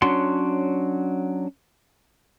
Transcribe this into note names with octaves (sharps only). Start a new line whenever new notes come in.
F#3 C#4 D4 F#4 C6